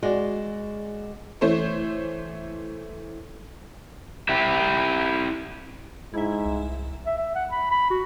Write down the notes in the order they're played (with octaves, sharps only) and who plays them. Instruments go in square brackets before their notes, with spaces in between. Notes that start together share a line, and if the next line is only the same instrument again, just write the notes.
[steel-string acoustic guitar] G#3 [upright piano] F#4 D5
[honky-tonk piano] E3 A3 C5 C#5
[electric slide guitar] E4 G4 E5
[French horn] G#2 [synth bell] E4 E5
[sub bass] C2
[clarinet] E5
E5
F#5
B5
B5
F#4